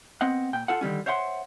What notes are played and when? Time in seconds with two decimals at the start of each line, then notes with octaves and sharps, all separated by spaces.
0.21 B3 C4 D#5 F#5
0.53 A#2 G5
0.68 F4 A4 F#5
0.81 D3 D#3 G3 C#4
1.06 C5 C#5 E5 F#5 C6